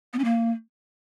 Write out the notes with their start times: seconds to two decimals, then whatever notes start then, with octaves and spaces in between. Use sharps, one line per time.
0.13 B3
0.19 C#4
0.24 A#3